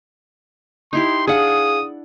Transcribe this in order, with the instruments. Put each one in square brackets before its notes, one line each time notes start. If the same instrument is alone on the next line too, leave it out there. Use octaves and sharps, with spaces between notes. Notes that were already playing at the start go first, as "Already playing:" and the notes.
[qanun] D#4 E4 G4 [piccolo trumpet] C6
[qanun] D4 F#5 [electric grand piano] G#4 F5 [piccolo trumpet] D#6